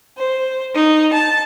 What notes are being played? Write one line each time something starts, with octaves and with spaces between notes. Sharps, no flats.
C5
D#4
A5